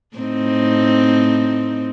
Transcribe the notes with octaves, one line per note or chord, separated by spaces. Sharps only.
A2 C4 D#4